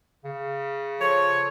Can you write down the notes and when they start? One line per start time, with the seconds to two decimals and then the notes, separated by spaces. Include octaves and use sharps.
0.24 C#3
1.00 F3 A4 C#5